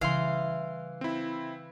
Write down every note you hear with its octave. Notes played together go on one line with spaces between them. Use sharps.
C#3 E3 G3 F5 C6
C4 E4